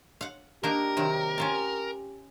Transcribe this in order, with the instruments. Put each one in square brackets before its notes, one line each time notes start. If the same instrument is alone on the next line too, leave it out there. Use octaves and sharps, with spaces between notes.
[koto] F5 F#5
[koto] A#3 D4 D#4 [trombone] G4 [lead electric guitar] A#4
[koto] C3 D#3 F#3
C#4 F4 A5